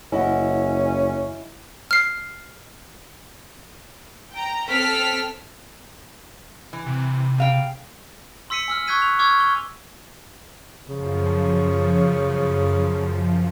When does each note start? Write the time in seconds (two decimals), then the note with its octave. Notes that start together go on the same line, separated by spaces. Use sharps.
0.12 F#1 C#4 E4 D#5 F#5
1.91 F6 C7
4.32 G5 A#5
4.70 C4 A4 F6 B6
6.73 E3
6.86 C3
7.38 C#3 F5 G5
8.50 C6 E6 B6 C#7 D#7
8.68 G#5 E6 F6
8.87 C#6 E6 F#6 G#6 B6 D#7
9.02 F7
9.19 C#6 D6 E6 F6 G#6
9.39 F6 G7
10.89 F#2 C#3 F3